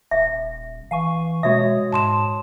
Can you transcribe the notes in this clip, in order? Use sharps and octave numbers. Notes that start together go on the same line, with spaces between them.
D#1 E5
E3 F5 G#5 C#6
B2 G#3 F#4 C#5 E5 D#6
G#2 A5 C6 E7